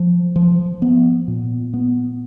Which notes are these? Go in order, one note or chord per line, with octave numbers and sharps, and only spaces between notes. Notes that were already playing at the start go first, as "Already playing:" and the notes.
Already playing: F3
F3
B3
A#2
B3